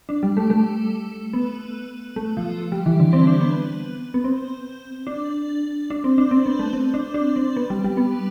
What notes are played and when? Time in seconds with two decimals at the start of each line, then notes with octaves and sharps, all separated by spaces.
0.09 D4
0.23 G3
0.37 A3
0.50 A3
1.33 B3
2.16 A3
2.37 F3
2.72 G3
2.86 E3
3.00 D3
3.13 C4
3.27 D4
3.41 B3
4.14 B3
4.24 C4
5.07 D4
5.90 D4
6.04 C4
6.18 D4
6.31 C4
6.46 B3
6.59 A3
6.73 C4
6.94 D4
7.14 D4
7.36 C4
7.57 B3
7.70 G3
7.84 G3
7.97 B3